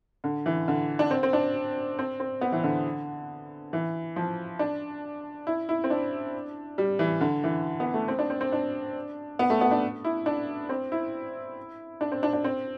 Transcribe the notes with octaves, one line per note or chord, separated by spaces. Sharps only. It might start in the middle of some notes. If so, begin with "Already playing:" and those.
D3
E3
D3
D4
C4
C4
D4
C4
C4
B3
E3
D3
E3
F3
D4
E4
E4
C4
D4
G3
E3
D3
E3
B3
A3
C4
D4
C4
C4
D4
B3
A3
B3
D4
E4
D4
C4
E4
D4
C4
D4
D4
C4